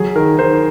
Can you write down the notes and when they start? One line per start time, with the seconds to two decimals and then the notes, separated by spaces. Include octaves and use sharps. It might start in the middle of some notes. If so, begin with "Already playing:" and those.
Already playing: F#3 G#4
0.16 D#3 A#4
0.38 D#3 C5